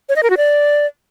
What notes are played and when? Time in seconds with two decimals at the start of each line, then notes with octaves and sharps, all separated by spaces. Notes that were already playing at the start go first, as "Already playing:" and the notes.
0.09 C#5
0.16 D#5
0.23 A#4
0.30 F#4
0.37 D5